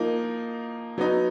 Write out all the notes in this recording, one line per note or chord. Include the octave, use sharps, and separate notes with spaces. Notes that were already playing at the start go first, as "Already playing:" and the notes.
Already playing: F3 A#3 D#4
F#3 B3 D#4